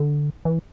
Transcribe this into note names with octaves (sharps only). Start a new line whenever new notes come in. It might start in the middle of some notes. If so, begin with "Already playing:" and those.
Already playing: D3
E3